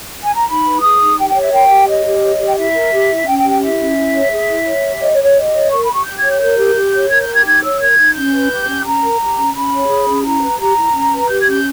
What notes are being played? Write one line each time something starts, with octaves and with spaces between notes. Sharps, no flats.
G#5
A#5
D#4 B5
B4
G#4 D#6
D#4
G4 G5
G5
C#5
E5
A#4 G5
G4
C#5 D#5
G4
C#5
G4
G5
E4 E5
A#4
G4
E4
C#4 G5
G5
G4
G5
E4 E5
C#4
E4
C#5
G#4
E4
C#5
G4
C#5 D#5
C#5
G4
C#5
G4 D#5
C#5
A#4 C#6
B5
G4
C#6
G4 G6
G#6
C#5
G6
A#4 G6
G4
G4
C#5
A#4 G#6
G6
G4 G#6
D#4 G#6
C#5 E6
A#4 G#6
D#4
C#4 G6
B4
G4
C#4
C#4 A#5
A#4
G4
C#4
C#4 B5
C#5
G#4
C#4
E4 A#5
B4
G4 A#5
E4
C#4
B4
G4 G6
G#6
C#4 G6